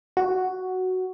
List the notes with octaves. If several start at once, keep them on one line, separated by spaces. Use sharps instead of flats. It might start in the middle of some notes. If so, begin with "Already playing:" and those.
F#4